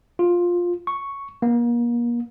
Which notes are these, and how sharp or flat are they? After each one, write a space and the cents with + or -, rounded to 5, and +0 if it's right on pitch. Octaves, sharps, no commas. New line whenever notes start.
F4 +10
C#6 +0
A#3 +35